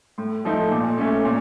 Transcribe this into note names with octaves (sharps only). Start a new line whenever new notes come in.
A2
F3 A3 D#4
A#2
A3 C#4
A#2